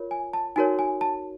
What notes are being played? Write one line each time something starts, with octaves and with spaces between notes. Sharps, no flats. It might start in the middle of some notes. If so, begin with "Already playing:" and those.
Already playing: F4 A#4 C#5
G#5
A5
D#4 F#4 A#4 C#5 G#5
G#5
A5